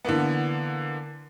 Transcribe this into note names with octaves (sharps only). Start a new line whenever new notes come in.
D3 E3 A#3 B3